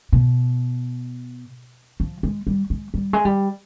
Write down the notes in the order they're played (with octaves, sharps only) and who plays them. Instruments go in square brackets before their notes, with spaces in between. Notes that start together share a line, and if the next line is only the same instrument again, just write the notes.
[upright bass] B2
F3
G#3
G3
G#3
G3
G#3
G3